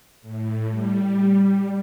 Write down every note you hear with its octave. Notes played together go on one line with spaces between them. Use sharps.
A2
G3